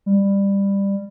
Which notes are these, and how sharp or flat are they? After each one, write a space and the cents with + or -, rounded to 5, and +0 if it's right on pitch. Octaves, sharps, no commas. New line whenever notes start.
G3 +15